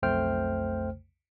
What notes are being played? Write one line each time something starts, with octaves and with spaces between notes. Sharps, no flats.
B1 F2 A3 C5 G5 F6